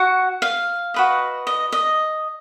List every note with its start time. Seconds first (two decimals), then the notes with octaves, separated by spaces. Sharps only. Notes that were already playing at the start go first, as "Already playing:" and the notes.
Already playing: F#4 F#5
0.42 F5
0.94 F#4 B4 D#5
1.47 D#5
1.72 D#5